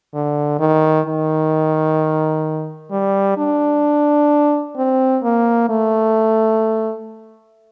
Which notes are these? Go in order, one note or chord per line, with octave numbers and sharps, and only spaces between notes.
D3
D#3
D#3
G3
D4
C4
A#3
A3